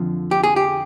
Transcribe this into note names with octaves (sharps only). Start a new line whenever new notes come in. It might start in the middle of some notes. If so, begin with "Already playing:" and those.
Already playing: F2 D3 F3
G4
G#4
G4